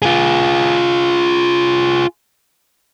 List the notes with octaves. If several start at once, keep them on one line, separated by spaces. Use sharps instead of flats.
F4 G#4